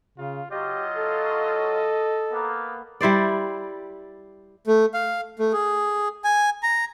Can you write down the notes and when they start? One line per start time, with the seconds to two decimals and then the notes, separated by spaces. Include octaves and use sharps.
0.18 C#3 F4
0.51 F#3 F4 G4 D#5
0.95 A4
2.31 A#3 B3
3.01 G3 E4 C5 D5
4.67 A3
4.94 F5
5.39 A3
5.53 G#4
6.24 G#5
6.63 A#5